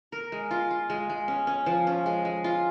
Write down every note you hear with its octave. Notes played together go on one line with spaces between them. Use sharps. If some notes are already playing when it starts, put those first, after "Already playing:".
A#4
G#3
F4
F4
G#3
G#3
C#4
C#4
F3
C#4
G#3
G#3
F4